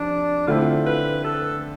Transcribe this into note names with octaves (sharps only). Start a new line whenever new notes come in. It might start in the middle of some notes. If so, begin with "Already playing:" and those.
Already playing: C3 F3 D4
D3 A3 C4 E4 F4
B4
A4